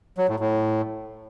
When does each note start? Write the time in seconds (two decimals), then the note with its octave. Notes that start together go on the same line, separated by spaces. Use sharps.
0.18 F#3
0.29 A2
0.40 A2